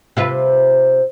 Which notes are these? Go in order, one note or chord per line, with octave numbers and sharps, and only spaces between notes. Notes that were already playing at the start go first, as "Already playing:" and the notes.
C3 F4 B4